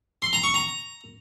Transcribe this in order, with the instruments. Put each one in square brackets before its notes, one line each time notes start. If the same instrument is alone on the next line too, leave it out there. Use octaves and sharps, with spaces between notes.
[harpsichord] C6
A#5
C#6
A#5